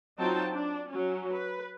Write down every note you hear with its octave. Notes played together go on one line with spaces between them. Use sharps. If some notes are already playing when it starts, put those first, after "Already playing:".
F#3 C4 D#4 F4 G5 A5
D4
F#3 C#4
B4